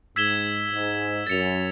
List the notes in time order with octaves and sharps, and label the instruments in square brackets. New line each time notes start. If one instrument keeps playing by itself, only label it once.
[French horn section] G#2 [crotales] E6 G#6 B6 E7 G7
[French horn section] G#2
[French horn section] F#2 [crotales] A6 C#7 F7